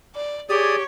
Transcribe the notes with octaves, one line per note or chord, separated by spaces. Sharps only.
D5
G4 G#4 C#5 D5 D#6